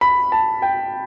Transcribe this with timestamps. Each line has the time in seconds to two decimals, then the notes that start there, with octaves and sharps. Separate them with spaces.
0.01 B5
0.32 A5
0.62 G5